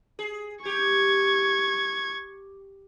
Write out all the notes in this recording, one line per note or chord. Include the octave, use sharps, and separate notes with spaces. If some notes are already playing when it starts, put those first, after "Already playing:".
G#4
G4 C#6 G#6